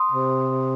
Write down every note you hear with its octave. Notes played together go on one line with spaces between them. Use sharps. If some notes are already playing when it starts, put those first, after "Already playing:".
Already playing: C6 D#6
C3